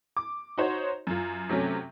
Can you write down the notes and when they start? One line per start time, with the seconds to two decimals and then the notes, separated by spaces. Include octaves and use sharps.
0.17 D6
0.58 D#4 F#4 C5 C#5
1.07 F#2 F4
1.49 C3 F#3 A3 C#4